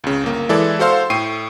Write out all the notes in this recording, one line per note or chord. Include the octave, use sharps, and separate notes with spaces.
C#2 C#3
G1 A#3
E3 G#3 E4 A4 D5
F#4 A4 C5 F5 C6 E6
A2 G5 C#6 C7 D#7